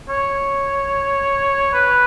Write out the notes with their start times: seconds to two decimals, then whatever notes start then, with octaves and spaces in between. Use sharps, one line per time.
0.09 C#5
1.73 B4